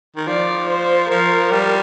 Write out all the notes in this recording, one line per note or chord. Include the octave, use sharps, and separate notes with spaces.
D#3
F3 D5
C5
F3 A#4
G3